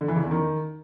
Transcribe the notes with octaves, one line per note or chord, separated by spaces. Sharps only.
D3
E3
C#3
E2
D#3